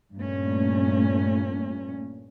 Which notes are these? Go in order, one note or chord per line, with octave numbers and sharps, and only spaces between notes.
G2 A#2 A3 C#4